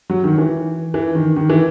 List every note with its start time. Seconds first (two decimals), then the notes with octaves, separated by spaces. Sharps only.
0.10 F#3
0.24 D#3
0.38 E3
0.94 E3
1.15 D#3
1.36 D#3
1.50 E3